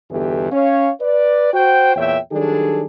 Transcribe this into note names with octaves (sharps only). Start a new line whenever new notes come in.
G1 E2 B2 E3 G4 A4
C#4 C#5 F5
B4 D5
F#4 C5 G5
E2 A#2 C#5 E5 G5
D#3 F#3 G3 D4 G#4 A4